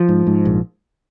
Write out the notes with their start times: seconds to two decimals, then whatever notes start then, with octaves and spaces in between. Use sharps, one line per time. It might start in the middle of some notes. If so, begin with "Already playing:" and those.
Already playing: F3
0.09 G#2
0.27 G#2
0.45 A#1